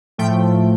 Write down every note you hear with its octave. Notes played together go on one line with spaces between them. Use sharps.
A2 F3 A3 G5